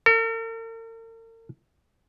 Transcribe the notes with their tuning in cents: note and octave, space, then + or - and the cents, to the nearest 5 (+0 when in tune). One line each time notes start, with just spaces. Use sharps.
A#4 -45